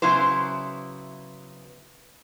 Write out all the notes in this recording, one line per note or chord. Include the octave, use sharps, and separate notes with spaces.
C#3 F#3 B3 E4 C5